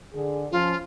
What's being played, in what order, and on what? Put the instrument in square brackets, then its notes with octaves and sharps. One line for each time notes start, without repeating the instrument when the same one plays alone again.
[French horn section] D3 G#4
[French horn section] F3 C#4 [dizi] F4